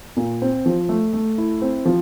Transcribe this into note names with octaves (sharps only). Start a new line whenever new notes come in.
A#2
C4
F3
A3
A3
E4
C4
F3